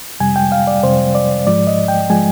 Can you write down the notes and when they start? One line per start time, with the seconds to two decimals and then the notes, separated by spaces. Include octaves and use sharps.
0.20 F2 C3 G3 G#5
0.36 G5
0.52 F5
0.67 D5
0.83 F2 C3 G3 C5
1.15 D5
1.46 G#2 F3 G#3 D5
1.67 D#5
1.88 G5
2.10 F3 G#3 G#5